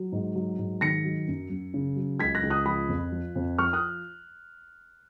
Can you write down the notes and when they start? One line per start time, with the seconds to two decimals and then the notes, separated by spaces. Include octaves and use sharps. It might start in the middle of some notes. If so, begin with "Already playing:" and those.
Already playing: F#3
0.12 G#2
0.35 F#3
0.58 G#2
0.81 D#3 A#6 C#7
1.04 F#3
1.28 F#2
1.50 F#2
1.74 C#3
1.96 F#3
2.20 C#2 G#6 B6
2.35 F#6 A#6
2.43 C#2
2.50 D#6 F#6
2.66 F3 B5 D#6
2.89 F2
3.12 F3
3.36 F2
3.58 F3 C#6 F6
3.73 D#6 F#6